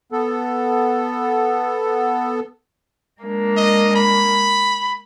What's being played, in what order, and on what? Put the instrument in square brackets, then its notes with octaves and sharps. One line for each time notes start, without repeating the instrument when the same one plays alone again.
[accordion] B3 A4
[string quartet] G#3 A#3 D4
[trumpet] D#5
B5